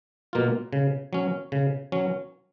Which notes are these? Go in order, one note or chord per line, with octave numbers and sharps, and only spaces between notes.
B2 A#3 F4
C#3
F#3 C#4
C#3
F#3 C#4